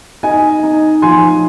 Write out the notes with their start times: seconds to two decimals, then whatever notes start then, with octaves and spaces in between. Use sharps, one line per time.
0.23 D#4 D#5 G#5
0.63 D#4
1.02 F3 G#5 C6